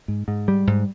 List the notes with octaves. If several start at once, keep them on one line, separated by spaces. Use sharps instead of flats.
G#2
G#2
G3
G#2